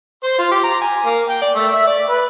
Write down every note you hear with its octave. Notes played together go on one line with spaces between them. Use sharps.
C5
F4
G4
A#5
G#5
A#3
G5
D5
A3
E5
D5
B4